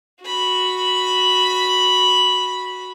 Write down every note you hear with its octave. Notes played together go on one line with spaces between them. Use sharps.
F#4 B5